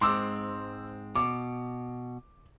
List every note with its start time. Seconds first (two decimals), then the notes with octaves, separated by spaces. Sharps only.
0.01 G#2 G#3 C4 C6 D6 E6
1.15 B2 D6